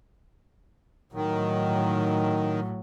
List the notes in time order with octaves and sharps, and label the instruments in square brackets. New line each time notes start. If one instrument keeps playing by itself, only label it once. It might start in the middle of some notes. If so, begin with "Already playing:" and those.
[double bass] A2 F#3 [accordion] D#3